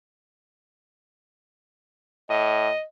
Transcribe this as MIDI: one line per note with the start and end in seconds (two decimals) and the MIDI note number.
2.30 2.68 45
2.30 2.83 75